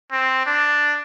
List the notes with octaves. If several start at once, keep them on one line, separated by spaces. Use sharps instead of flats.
C4
D4